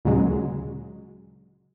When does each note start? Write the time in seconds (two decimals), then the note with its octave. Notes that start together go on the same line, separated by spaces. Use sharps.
0.05 D2 A#2 C#3 F#3 G#3